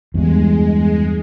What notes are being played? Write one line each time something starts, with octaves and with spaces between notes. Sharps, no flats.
E2 G2 G#3